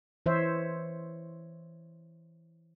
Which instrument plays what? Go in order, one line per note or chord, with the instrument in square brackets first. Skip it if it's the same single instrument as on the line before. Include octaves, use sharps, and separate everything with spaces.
[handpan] E3 C5 C#5 E5